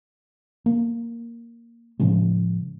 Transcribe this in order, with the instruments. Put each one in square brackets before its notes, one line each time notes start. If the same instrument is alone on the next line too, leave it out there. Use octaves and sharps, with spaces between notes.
[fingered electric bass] A#3
A2 C#3 F3 G#3